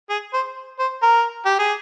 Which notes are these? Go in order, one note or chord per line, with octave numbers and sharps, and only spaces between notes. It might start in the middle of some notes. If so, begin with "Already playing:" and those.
G#4
C5
C5
A#4
G4
G#4